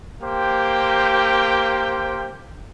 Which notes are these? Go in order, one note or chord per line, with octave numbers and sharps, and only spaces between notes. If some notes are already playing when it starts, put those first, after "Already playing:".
A#3 G4 C5 G5